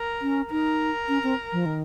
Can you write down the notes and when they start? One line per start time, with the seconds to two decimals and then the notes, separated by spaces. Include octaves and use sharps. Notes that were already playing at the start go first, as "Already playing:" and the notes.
Already playing: A#4
0.22 C#4
0.51 D#4 A#4
1.08 C#4
1.23 C4
1.52 F3
1.66 D#3